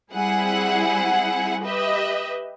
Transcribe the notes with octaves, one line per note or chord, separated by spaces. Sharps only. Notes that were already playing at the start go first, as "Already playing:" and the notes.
G3 C4 E4 G#4 F#5
G4 B4 D#5 E5